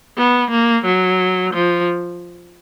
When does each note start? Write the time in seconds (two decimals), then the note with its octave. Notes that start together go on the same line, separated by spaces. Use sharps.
0.18 B3
0.51 A#3
0.85 F#3
1.54 F3